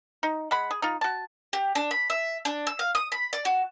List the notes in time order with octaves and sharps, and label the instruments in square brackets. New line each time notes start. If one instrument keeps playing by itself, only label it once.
[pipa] D#4
G#3 F#5 B5
G#4
D#4 F4
F#4 A5
[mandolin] G4
D4
B5
E5
D4
E6
F5
D#6
B5
D5
F#4